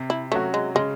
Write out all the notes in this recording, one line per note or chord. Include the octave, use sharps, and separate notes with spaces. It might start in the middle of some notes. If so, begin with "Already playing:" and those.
Already playing: C3
E4
F#3 A3 C#4 F#4
G#3
C#3 G#3